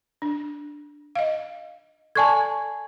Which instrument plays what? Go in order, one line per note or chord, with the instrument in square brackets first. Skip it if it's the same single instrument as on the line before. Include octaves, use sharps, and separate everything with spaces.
[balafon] D4
D#5 F5
[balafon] A4 D5 A5 [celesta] G#5 C#6 G#6